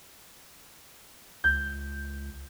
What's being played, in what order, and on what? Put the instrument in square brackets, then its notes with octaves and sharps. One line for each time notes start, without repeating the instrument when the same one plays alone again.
[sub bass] C#2 [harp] G6